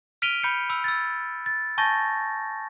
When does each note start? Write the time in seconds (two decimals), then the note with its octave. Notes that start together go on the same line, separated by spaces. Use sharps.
0.22 F6 B6 D7 D#7 F7 G7
0.43 B5 G6 C#7
0.70 B5 E6
0.84 E6 A6
1.46 A6
1.78 G#5 A5 C#6 G6 A6 A#6